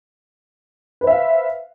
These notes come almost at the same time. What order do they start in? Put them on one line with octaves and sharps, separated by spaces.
B4 C5 E5 F5